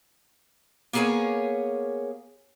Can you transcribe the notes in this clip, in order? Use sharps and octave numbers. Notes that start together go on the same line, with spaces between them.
A#3 B3 G#4 A#4 C#5 G#5